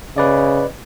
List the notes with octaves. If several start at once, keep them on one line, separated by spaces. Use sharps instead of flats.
C#3 B4 D5 D#5